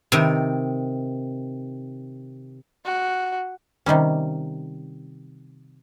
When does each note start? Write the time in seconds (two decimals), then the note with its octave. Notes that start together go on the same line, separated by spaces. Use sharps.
0.12 C3 D#3
2.85 F#4
3.86 C3 D#3 G3 C#4